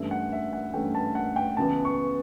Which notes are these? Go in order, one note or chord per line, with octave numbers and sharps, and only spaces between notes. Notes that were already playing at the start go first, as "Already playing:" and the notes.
Already playing: G2 E3 A3 C#4 E5
F#5
E5
F#5
G2 E3 A3 C#4 G5
A5
F#5
G5
C#2 C#3 E3 B3 A5
C#6